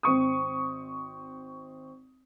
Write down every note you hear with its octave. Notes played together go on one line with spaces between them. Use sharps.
G#1 C4 C#6 D#6